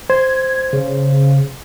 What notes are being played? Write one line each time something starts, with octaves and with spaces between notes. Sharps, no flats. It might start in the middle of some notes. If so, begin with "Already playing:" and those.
C5 G#6
C#3